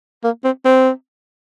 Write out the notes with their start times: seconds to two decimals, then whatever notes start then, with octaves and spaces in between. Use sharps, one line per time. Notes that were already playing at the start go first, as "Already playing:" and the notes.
0.24 A#3
0.44 C4
0.65 C4